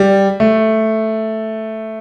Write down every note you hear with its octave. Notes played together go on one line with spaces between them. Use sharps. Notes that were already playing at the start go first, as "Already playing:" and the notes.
Already playing: G3
A3